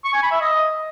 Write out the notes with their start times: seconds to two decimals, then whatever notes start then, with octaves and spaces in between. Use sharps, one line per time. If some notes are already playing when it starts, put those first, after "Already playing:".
0.05 C#6
0.14 G#5
0.23 B5
0.32 E5
0.41 D#5